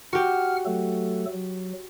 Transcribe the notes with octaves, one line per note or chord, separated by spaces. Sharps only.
F#4 G4 F#5 F6
F#3 A3 A4
F#3